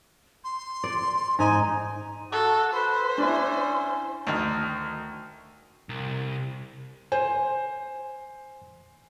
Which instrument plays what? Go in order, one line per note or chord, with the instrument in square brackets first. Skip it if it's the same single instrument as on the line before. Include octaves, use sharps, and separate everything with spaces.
[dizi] C6
[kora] D5
[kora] G#2 D#4 [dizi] G#5
[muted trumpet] F#4 [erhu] A4
[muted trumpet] B4 [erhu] C5
[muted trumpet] C#4 [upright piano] D4 E4
[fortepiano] D2 D#3
[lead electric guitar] C2
[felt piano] C5 [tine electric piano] G#5